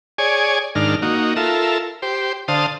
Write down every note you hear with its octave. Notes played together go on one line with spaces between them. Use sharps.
G#4 C#5 D5 G#5
G#2 D#3 D4 A#4 F6
A#3 D#4 F#4
F4 A4 A#4 E5
G4 C5
D3 C5 F5 A5 D#6